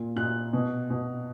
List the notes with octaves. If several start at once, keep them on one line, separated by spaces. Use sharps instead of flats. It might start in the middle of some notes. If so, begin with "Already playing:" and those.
Already playing: A#2
A#2 F#6
B2
B2